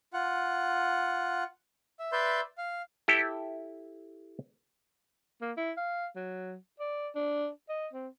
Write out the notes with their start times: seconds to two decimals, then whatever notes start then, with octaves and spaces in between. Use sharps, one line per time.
0.13 F4 F#5
1.99 E5
2.12 B4 D5 E5 C6 G6
2.58 F5
3.08 E4 G4 A4
5.41 A#3
5.57 E4
5.77 F5
6.16 F#3
6.80 D5
7.15 D4
7.69 D#5
7.93 C4